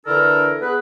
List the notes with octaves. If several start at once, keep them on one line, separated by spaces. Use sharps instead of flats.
D3 E3 D4 E4 A4 A#4
B3 G#4 B4